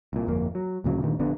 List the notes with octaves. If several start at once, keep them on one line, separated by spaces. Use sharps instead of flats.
C2 A#2
G1 F2 A#3
F#3
D2 A#2 C#3 F#3
D2 G2 A#2 D#3
A#1 D3 B3 D4